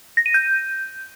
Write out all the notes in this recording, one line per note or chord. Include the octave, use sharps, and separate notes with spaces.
A#6
D#7
G6